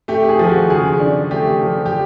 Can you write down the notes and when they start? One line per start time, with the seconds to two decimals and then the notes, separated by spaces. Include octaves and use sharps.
0.08 A3 G4
0.29 G#4
0.39 F3
0.49 F#4
0.70 C#3 G#4
1.00 D4
1.31 A3 G4
1.61 F3
1.86 G4